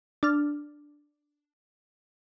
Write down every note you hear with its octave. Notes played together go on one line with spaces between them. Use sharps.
D4 F6